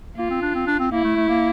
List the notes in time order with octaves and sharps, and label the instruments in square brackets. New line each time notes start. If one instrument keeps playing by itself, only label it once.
[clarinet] A#3 [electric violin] F4
[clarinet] C4
D4
C4
D4
C4
[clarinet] A#3 [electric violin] E4
[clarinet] A3
A3
A#3